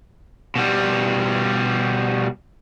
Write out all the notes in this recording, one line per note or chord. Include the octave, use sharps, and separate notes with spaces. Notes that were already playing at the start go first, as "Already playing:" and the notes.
B2 G3